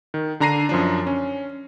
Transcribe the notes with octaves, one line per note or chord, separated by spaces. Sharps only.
D#3
D3 D4 A#5 A#6 C7 D#7
F#2 F3 D4
C#4